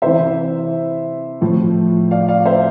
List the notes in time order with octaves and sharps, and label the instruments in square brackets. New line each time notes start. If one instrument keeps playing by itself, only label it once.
[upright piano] C3 E3 C5 E5
A2 F3
D5 F5
D5 F5
C5 E5